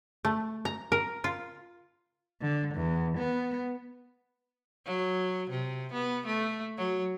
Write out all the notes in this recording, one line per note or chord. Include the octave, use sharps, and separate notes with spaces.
A3
A#5
A#4
F4
D3
E2
B3
F#3
C3
B3
A3
F#3